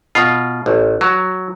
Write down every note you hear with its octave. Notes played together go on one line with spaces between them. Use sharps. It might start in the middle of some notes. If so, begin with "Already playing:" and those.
B2 F4
A1
F#3